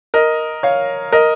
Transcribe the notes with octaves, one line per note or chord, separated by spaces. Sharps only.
A#4 D#5
C#5 F5
A#4 D#5